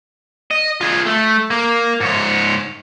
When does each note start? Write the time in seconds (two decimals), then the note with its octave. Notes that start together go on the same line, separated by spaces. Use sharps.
0.51 D#5
0.81 F4 G#4
1.06 A3
1.50 A#3
2.01 G#2 C#5